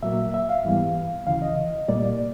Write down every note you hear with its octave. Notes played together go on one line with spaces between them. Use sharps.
A#2 F#3 A#3 E5
E5
F5
G#2 E3 G3 B3
D2 C#3 E3 F5
D#5
C2 A#2 G3 A#3 D5